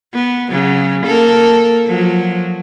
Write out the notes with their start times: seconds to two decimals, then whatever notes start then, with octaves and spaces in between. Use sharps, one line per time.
0.14 B3
0.51 C#3 F#3
1.07 A#3 A4 A#4
1.87 F3 F#3